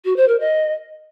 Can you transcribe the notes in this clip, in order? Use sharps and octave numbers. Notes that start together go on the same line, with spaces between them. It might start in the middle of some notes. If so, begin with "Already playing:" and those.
F#4
C5
A#4
D#5